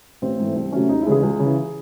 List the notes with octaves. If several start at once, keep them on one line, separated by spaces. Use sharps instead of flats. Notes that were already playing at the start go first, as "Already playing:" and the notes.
A1 C4
G#2 E3 A3
C2 C4
C3 F#3 A3 C#4
D#2 D#4
E4
C#3 E3 G#3 G#4
C#2
C#3 E3